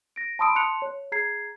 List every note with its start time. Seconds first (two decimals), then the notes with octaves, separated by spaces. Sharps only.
0.16 A#6 D7
0.39 A5 B5 C6 D#6 E6 D7
0.55 A5 C6 F#6 C#7 F7
0.82 C#5
1.12 G#4 A#5 G#6 C7